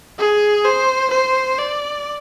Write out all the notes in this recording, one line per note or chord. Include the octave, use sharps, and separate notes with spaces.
G#4
C5
C5
D5